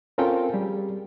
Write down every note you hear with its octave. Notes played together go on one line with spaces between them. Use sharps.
C4 C#4 F4 A4 A#4 G5
G3 G4 G#4